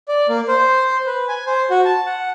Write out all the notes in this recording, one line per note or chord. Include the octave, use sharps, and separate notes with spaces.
D5
A#3
C5
B4
G#5
C5
F#4
A5
F#5